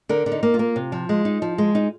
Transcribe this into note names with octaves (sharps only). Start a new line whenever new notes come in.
D3 A#4
D3
D#4
A#3
F4
A#3
C3
F3
G#3
D#4
F3
G#3
D#4